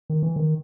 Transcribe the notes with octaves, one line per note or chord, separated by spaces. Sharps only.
D#3
E3
D#3